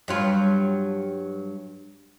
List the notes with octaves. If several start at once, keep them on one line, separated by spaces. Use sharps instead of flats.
G2 F#3 F4